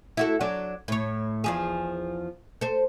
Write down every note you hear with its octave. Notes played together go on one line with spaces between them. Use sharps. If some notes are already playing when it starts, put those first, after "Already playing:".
E4 F#4 A4
F#3 D4
A2 C#5
E2 F3 G#4
A4 C5